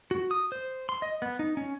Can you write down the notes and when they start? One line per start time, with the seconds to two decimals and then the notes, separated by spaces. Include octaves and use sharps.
0.11 F#4
0.31 D#6
0.52 C5
0.89 C6
1.02 D#5
1.22 B3
1.39 D#4
1.57 C#4